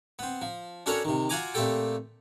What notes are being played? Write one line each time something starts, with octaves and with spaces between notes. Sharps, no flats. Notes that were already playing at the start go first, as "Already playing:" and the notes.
B3 C4
F3
C#4 D4 F#4 A4 A#4 C#5
C3 D#3
F4 F#4 F#5 G#5 A#5 D6
A#2 A3 C4 G4 A4 G5